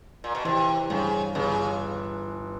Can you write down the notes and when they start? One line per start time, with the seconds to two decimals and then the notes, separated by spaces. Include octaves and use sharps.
0.24 A#2
0.35 B2
0.45 C3 E3
0.90 G2 C#3
1.35 G1 C#3